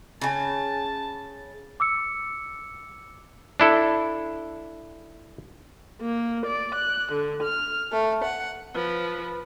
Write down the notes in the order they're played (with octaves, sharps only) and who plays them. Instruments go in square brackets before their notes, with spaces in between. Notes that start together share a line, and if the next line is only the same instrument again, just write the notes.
[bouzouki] C#3 G#5 [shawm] A5
[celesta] D6 E6 C#7
[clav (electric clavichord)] D4 E4 A4
[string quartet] A#3
D5
F#6
D3
F6
A3
F#5
[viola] F3 [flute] B4